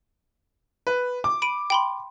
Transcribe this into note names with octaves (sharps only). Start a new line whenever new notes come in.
B4
D6
B5 D7 D#7
G5 B5 C6